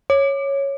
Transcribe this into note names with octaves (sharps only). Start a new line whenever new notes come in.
C#5